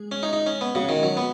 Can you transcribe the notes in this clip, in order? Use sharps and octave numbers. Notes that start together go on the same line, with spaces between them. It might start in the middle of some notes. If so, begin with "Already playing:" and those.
Already playing: G#3 G#4
C#4
D#4
D#4
C#4
B3
C#3 G#3 C#4 F#4
D#3
F#3
B3